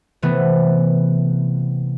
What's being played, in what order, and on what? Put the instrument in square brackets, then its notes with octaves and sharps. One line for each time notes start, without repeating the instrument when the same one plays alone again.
[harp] C3 E3 A3 B3